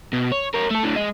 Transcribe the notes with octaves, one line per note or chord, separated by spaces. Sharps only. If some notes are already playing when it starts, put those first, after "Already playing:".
B2
C#5
A#4 C#5
A3 A4
A2 D3
G#3 D#5